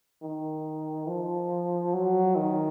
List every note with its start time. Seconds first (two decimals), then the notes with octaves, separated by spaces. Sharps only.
0.22 D#3
1.07 F3
1.94 F#3
2.36 D#3